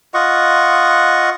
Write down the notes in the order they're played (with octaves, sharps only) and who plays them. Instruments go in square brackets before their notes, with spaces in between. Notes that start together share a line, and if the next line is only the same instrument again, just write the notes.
[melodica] F4 D#5 F#5 C#6